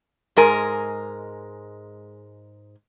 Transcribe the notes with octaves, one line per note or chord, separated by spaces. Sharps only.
G#2 G#3 A#4 G#5